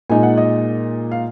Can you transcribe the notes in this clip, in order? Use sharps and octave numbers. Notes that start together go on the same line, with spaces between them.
A#2 G#3 D#4 G#5
F#5
D#5
F5